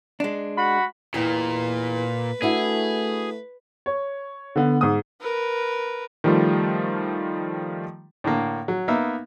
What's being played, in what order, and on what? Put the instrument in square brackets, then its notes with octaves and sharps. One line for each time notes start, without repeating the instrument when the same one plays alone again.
[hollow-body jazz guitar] G#3 D4
[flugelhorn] F#4 [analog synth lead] B5
[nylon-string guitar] E2 D#5 G5 [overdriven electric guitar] A#2 [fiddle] B4
[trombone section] A3 [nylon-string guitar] D4 E4 F#4 [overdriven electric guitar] G#4
[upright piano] C#5
D3 B3
G#2 D#6
[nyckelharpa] A#4 B4
[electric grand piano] D#3 F3 G3 A3 F4
[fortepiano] A2 D3 A#3
F#3
A#3 B3 D#4 E5